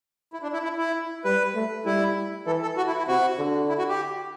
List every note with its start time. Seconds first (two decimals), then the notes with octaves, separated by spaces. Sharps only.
0.33 E4
0.43 D4
0.53 E4
0.63 E4
0.78 E4
1.25 G3 B4
1.55 A3
1.86 G3 E4
2.47 E3 A4
2.62 A4
2.77 F#4
2.87 E4
2.98 E4
3.08 C3 F#4
3.38 D3
3.69 E4
3.78 F#4
3.89 G4